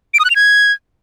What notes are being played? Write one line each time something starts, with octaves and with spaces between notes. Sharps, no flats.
D7
D#6
F#6
F7
G#6